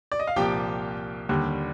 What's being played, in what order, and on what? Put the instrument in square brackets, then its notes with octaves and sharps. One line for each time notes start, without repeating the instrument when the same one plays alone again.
[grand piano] D5
D#5
F5
C2 A#2 F3 G4 G5
D#2 D3 G3